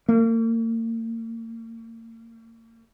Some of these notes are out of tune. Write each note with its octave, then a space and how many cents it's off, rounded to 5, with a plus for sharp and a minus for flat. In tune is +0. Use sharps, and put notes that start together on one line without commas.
A#3 -40